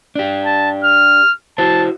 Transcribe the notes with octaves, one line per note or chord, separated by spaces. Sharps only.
D4 G4
A5
F6
E4 F#4 C5 A5